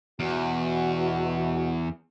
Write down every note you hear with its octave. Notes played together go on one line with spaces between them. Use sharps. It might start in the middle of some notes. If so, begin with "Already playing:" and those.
E2 B2 E3 F#4